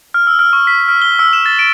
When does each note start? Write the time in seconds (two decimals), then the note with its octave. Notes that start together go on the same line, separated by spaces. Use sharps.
0.14 F6
0.27 E6
0.39 F6
0.53 C#6
0.67 B6
0.88 F6
1.02 G7
1.19 E6
1.33 E7
1.46 A6
1.59 D7